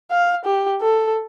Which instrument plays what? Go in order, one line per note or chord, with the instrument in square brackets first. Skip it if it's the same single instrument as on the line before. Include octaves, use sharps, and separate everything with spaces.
[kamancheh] F5
G4
A4